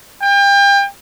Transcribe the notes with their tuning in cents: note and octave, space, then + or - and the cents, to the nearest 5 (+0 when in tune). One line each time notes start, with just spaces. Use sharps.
G5 +35